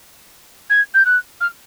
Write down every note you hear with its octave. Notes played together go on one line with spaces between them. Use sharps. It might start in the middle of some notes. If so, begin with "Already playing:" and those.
G#6
G6
F#6
F6